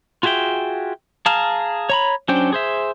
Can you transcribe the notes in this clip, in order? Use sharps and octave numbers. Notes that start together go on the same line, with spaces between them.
F4 F#4 G#4 E5 G5
G#4 F5 A5 A#5 F6
C#5 A#5 B5
F#3 C#4 D4 C5 G5
G#4 C5 E5